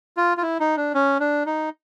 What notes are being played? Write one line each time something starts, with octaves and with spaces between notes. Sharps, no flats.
F4
F4
E4
D#4
D4
C#4
D4
D#4